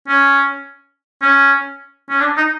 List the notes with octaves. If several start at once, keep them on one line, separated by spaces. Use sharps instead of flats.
C#4
C#4
C#4
D4
D#4